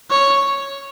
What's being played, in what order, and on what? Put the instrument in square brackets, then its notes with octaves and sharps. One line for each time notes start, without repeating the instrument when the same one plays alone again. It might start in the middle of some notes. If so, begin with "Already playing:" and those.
[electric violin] C#5